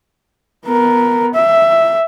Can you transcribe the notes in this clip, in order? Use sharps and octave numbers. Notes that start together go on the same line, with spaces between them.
B3 A#4
E5